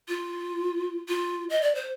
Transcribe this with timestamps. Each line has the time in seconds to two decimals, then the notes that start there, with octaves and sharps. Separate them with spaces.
0.08 F4
1.08 F4
1.50 D#5
1.62 D5
1.75 C5